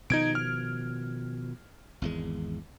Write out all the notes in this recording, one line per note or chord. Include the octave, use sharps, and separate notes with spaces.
B2 D#3 F3 D#4 G#6 D7
F6
G#1 E2 G#3